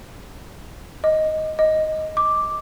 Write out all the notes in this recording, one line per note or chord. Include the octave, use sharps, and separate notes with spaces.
D#5
D#5
D6